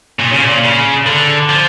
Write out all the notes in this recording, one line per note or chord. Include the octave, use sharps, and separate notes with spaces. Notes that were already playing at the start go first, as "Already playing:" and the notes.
A#2
C#3
A#2
C#3
D3
F3